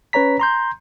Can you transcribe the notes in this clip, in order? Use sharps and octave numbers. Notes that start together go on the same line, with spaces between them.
C#4 B4 C#5 A#5 B6
A#5 C6 G6